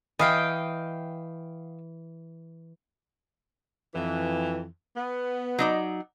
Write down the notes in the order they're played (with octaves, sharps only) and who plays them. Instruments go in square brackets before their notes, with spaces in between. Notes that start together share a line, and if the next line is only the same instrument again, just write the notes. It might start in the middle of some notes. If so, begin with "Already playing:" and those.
[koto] E3 [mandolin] D#5 F5 G5
[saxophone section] F2 E3
B3
[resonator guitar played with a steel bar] F#3 D#4 D5